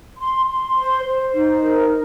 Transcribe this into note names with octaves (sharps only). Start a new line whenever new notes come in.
C6
C6
C5
C5
D#4
A#4